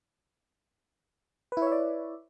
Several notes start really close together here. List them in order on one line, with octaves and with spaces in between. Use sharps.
B4 E4 C#5 E5 D5